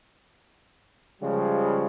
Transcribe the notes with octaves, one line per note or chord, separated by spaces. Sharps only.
C#3 F3 G3 G#3